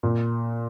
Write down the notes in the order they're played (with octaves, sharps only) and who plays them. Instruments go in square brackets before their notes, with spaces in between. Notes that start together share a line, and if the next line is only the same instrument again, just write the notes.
[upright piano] A#2